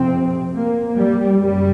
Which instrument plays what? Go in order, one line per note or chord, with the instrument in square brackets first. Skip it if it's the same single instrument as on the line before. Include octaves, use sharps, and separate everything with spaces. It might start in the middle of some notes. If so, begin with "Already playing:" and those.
Already playing: [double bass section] F2 C3 C4
A#3
G3
F#2 C#3 G3